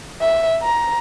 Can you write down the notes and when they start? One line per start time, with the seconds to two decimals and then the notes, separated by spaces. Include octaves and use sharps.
0.21 E5
0.62 A#5